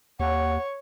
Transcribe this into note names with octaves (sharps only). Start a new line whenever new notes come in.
D#2 C#5 F#5